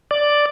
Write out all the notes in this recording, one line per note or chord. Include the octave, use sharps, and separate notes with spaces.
D5